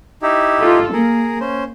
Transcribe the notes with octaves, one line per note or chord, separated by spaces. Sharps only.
D#4 E4 G4
F4 A4
A#3 G#4 A#4
C#4 C5